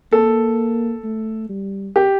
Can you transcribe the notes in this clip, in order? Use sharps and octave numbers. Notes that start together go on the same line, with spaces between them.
A#3 A4
A3
G3
G4